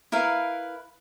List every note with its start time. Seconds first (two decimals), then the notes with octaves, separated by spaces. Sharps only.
0.12 E4 A#4 B4 F5